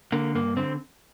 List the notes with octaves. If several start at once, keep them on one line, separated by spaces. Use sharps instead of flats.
D3 A#3
G2 A#3
D3 C4